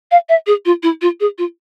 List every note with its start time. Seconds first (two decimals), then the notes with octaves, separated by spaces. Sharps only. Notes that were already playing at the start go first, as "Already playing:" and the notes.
0.11 F5
0.29 E5
0.47 G#4
0.65 F4
0.83 E4
1.02 F4
1.20 G#4
1.38 F4